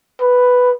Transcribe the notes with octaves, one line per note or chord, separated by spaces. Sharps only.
B4